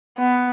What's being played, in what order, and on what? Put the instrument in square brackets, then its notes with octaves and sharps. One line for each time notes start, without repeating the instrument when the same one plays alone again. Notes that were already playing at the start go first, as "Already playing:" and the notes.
[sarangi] B3